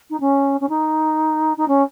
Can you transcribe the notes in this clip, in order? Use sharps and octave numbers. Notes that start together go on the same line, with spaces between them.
D#4
C#4
C#4
D#4
D#4
C#4